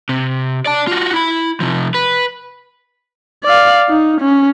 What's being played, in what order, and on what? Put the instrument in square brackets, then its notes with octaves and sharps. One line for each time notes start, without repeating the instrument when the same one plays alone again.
[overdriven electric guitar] C3
D5 A5
F4 F#4
E4 B5
C3 F3
B4
[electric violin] D5 F5
D#4
C#4